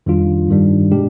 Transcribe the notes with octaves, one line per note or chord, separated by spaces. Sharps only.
F2 D#3 G3 D4 F4
G2 D#3 G3 D4
B2 G#3 D4 G4